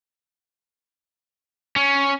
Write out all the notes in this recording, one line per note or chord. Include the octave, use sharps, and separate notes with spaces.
C#4